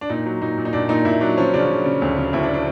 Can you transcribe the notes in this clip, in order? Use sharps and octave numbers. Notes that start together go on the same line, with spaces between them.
D4
A#2 D#4
F#3
A#2 D#4
A#2
D#4
A#2 D4
A#2 D#4
A#2 E4
F#3 D4
F3 C#4
C#3 D4
C#3
C#3
D2
C#3
D2 E4
D4
D4